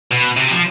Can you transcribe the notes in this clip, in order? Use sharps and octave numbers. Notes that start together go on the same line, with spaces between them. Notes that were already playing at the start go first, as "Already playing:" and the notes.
B2
C3
F3